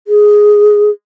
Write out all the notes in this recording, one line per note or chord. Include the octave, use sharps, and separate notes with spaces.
G#4